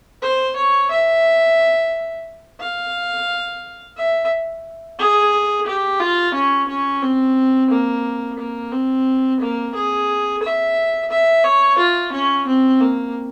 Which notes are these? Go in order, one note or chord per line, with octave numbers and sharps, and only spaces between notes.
C5
C#5
E5
F5
E5
G#4
G4
F4
C#4
C#4
C4
A#3
A#3
C4
A#3
G#4
E5
E5
C#5
F4
C#4
C4
A#3